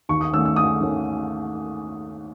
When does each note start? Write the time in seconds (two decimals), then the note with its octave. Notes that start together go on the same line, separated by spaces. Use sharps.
0.09 D#2 C#6
0.21 D#6
0.33 D#3 A3 C#4 E6
0.45 E6
0.56 D#2 D#6
0.80 D#3 A3 C#4